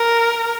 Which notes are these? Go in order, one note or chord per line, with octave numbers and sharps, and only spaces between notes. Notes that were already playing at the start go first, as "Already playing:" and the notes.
Already playing: A#4